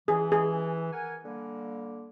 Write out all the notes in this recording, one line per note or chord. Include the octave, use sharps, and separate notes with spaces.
E3 G#4
G#4
A#4 F#5 G#5
D3 G3 A#3